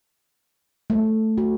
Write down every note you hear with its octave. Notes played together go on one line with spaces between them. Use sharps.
A3
F#4